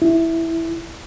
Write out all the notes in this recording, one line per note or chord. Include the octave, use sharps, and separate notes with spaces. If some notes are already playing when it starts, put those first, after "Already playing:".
E4